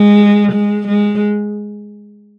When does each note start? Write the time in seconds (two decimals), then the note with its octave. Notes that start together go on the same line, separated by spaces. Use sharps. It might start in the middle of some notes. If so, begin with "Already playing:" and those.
Already playing: G#3
0.52 G#3
0.87 G#3